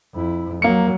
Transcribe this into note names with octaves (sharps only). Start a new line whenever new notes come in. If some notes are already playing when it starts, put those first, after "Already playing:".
F2 E4
F#3 A#3 C#7